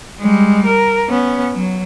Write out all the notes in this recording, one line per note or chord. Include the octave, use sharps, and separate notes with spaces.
G3 G#3
A#4
B3 C#4
F#3